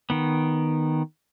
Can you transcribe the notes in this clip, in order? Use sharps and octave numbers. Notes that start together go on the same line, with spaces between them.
D#3 B3